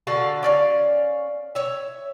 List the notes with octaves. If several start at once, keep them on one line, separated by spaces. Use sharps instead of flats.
D3 F#4 F5 A5
C#4 D5 F5
C#5 E5